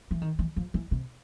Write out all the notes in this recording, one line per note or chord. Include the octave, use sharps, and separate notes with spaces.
E3
D#3
E3
F3
E3
C3